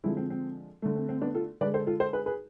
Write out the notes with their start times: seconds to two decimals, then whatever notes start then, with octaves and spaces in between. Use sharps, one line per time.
0.04 D3 F3 G#3 C4 E4
0.17 C4
0.30 C4
0.82 D3 A3
0.96 C4
1.09 C4
1.22 B3 D4
1.34 F4 A4
1.61 D3 B4 D5
1.65 G#3
1.74 A4 C5
1.87 F4 A4
2.00 A4 C5
2.13 G#4 B4
2.26 G#4 B4